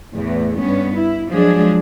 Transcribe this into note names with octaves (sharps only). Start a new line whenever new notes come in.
E2 A2 A3
G2 B3 C#4
E4
F3 F#3 G#3 D4 G#4